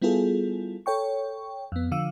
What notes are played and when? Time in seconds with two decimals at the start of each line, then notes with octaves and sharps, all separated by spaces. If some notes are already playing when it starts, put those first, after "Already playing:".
0.02 G3 B3 E4 F4 G#4 A4
0.86 A4 C#5 G5 C#6
1.72 F2 B3
1.92 D3 F3 F5 E6